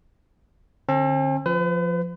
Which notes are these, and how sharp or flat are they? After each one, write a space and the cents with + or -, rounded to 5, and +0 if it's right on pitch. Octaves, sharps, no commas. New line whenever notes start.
D3 +5 C4 +45 A5 -15
F3 +0 B4 +40